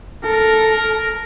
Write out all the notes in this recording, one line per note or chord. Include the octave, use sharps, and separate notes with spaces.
A4 A#4